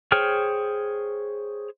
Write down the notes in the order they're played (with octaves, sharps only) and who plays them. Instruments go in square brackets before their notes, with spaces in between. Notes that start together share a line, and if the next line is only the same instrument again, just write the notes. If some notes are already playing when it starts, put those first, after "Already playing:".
[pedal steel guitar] G#4 C5 C#5 G5 F6